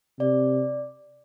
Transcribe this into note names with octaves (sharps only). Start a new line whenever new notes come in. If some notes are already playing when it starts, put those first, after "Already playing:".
C3 D5